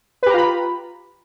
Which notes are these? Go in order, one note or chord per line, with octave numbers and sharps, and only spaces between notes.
F4 G4 B4 A#5 B5